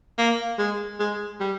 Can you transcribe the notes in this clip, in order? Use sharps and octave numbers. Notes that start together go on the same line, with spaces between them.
A#3
G#3
G#3
G3